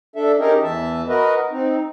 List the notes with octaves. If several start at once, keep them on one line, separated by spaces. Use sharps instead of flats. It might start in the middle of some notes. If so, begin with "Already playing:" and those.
D4 A4 E5
C#4 D#4 G4 G#4 A#4 D#5
E2 E3 E5 A5
F#4 A#4 B4 D#5
C4 D#4